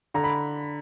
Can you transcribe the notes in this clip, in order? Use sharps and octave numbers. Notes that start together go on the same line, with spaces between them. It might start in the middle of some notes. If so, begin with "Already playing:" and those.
D3 A#5
B5